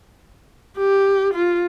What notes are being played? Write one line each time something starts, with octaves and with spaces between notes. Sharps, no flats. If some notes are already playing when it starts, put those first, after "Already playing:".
G4
F4